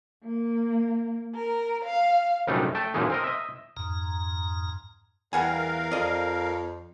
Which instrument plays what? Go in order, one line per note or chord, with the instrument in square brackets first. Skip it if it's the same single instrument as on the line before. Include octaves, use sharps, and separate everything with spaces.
[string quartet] A#3
A#4
F5
[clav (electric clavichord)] A#1 F#2 C3 G3 A3 D#4
A3 G5 A5
F#2 A#2 E3 G#3 D#4
C4 A#4 D#5
D#5 E5
[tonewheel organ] F2 G#2 A#5
[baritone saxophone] E2 [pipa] G3 F#5 G#5 [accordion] A#4 F5
[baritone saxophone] F2 [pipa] D5 D#5